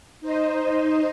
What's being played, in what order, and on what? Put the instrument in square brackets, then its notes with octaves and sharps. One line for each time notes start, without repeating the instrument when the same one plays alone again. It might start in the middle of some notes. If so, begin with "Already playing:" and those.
[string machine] D#4 C5 D#5